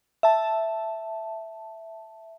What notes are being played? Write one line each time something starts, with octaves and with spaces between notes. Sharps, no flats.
E5 A5